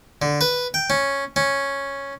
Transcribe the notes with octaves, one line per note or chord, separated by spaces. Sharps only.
D3
B4
G5
C#4
C#4